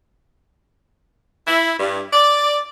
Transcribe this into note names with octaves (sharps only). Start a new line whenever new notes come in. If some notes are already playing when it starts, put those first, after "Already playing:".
E4
G2
D5